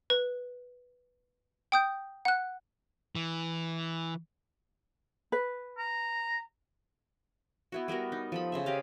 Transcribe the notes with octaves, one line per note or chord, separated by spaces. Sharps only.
B4
G5 D#6 G6
F#5 F#6
E3
B4
A#5
B3 E4 F#4
G3 B3 F#4 A#4
D#4
F3 A4 B5
C#3 C5 E5
G4 D#5 F5